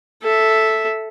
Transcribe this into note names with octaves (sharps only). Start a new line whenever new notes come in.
A4 E5